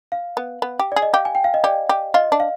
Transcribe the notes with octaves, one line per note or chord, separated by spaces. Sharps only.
F5
B3
B3
G4
G#4 D5
D#5
G4 F5
G#5
G5
F5
D#5
G4 D5
G4
F4 D#5
D4
F5